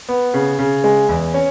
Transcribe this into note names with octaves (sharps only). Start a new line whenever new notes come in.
B3
C#3
C#3
G#3
E2
C#4